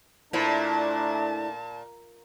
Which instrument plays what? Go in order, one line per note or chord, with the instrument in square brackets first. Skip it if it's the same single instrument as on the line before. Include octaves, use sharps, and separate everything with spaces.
[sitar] A#2 [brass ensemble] A3 D4 [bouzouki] E4 C5 [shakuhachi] A5